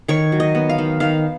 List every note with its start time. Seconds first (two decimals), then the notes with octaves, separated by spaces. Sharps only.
0.08 D#3 C#5
0.32 F#3
0.40 D#5
0.55 B3
0.69 F5
0.78 D#3
1.00 D#3 F5